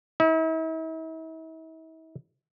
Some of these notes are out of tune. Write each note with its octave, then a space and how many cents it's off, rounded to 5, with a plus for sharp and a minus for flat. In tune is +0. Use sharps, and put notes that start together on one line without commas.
E4 -45